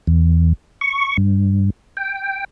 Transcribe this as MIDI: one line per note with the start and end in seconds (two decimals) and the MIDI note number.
0.07 0.53 40
0.81 1.17 85
1.17 1.70 43
1.97 2.44 79